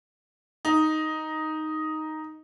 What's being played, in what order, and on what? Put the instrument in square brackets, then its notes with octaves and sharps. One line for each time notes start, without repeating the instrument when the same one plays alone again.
[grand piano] D#4